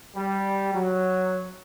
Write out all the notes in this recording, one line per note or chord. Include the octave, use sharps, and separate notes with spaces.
G3
F#3